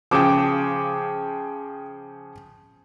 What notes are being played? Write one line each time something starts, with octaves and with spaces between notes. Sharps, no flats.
C#3 F3 G5 D6